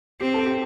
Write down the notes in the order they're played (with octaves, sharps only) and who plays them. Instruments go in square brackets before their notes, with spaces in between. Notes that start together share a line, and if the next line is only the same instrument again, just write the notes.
[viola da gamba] C4 [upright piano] G4
[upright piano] A4
G4